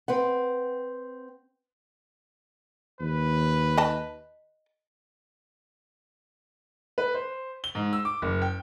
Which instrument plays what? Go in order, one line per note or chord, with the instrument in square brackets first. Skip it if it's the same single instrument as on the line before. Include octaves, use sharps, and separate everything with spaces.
[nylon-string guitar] C4 B4 F#5
[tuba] D#2 [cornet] B4
[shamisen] D#5 A5
[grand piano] B4
C5
G7
G#2
E6
D6
F#1
G5